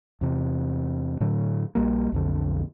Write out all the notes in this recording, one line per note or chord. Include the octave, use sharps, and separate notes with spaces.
E2 C3
A2 D3 F#3
A#1 F#2 G3 A#3
B1 F2 D3